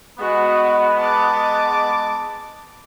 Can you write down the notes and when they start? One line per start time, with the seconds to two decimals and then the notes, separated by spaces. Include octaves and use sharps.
0.19 G#3 B3 F#4
0.99 A5 D6